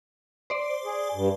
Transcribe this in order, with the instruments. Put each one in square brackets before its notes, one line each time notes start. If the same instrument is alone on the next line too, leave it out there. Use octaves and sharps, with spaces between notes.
[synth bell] C5 D5
[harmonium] G#4
G2